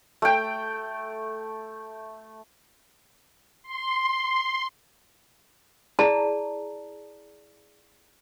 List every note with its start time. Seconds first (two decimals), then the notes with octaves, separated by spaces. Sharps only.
0.22 A3 G5
3.63 C6
5.99 E4 G#4 D5 A5 A#5